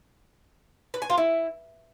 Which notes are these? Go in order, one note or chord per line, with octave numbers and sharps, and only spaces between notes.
B4
G#5
F4
E4